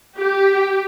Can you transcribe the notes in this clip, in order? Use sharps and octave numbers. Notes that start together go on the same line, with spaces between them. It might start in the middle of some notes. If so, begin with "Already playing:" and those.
G4